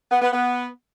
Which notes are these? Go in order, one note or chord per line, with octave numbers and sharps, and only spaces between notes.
B3
B3
B3